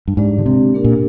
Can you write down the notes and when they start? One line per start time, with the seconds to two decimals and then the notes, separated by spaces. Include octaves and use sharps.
0.08 G2
0.17 G#2 G#3 D4 G4 D5
0.38 D3
0.46 C3
0.74 A#3 D4 G4 A#4
0.84 A#2